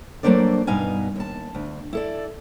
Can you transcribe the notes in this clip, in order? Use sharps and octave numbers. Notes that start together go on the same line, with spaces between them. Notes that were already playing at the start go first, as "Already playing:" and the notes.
F#3 A3 A#3 D4 C5 D5
G2 B2 D#4 F5 G#5
D#2 A5
D2
E4 A4 D5